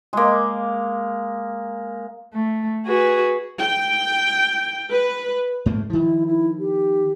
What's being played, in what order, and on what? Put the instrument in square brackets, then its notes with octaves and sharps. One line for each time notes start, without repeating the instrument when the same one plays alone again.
[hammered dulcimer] G#3 A#3
[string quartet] A3
F#4 G#4 B4
[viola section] G5
B4
[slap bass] G#2 A3 A#3
[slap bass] D#3 F3 [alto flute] E4
[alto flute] E4
G4